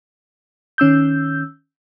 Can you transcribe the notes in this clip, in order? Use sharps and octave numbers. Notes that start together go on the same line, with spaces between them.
D#3 C#4 E6 G6